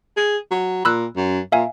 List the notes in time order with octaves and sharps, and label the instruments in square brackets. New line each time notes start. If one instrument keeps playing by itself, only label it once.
[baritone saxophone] G#4
F#3
[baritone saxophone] A#2 [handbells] B5 E6 F#6
[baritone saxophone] F#2
[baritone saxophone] A#2 [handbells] E5 F5 G#5